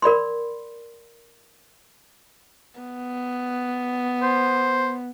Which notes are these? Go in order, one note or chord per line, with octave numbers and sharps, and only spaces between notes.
A#4 D5 B5 C6
B3
C5